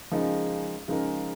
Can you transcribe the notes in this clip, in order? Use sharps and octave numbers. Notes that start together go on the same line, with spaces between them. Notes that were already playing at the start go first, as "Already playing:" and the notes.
C#3 F3 G#3 D#4 A#4
C#3 F3 G#3 D#4 A#4